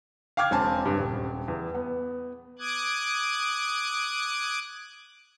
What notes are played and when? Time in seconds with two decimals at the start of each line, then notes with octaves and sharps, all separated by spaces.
0.37 F5 G5 D6 F6 G#6
0.51 E1 C4 G#5 A5
0.85 G2
0.99 D#1
1.48 E2
1.75 B3
2.59 D6 D#6 F#6 G#6